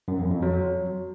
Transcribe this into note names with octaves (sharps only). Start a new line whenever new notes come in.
F#2
F2
F2
F#3